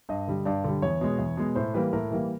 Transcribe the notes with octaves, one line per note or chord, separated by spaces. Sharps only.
G2 D#5
D3 G3
G2 D5
D3 G3
E2 C#5
B2 G#3
E2
B2 G#3
A2 C5
E3 G3 A#3 B4
A2 A#4
E3 G3 A#3